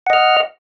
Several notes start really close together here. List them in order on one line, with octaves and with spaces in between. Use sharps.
F#5 D#5 F6